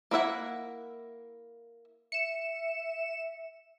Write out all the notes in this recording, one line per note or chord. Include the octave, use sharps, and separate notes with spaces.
A#3 E4 E5 F#5
E5 C#7 E7